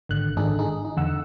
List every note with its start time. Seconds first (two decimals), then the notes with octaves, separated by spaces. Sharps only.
0.09 G#1 D3 F#6
0.37 G#1 D4 D#4 G#4 A4
0.59 D#4 G#4
0.85 D#4
0.97 E2 D3 F#5 E6